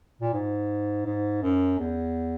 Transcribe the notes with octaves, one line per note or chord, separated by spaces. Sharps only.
A#2
G#2
G#2
F#2
E2